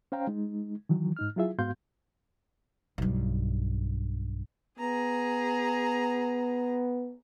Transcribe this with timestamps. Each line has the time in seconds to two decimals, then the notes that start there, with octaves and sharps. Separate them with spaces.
0.12 C#4 C5 F5 G5 A#5
0.27 G#3 D#4
0.89 D#3 E3 F#3
1.17 G#2 D#4 F6
1.36 F#3 E4 F4 G#4 E5
1.59 G#2 B3 F#4 F5 C6 G6
2.98 B1 G2
4.79 B3 G#4 A#5